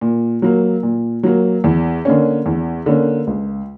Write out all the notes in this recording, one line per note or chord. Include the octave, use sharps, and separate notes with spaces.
A#2
F#3 A#3
A#2
F#3 A#3
E2
D3 A#3 C#4
E2
D3 A#3 C#4
C#2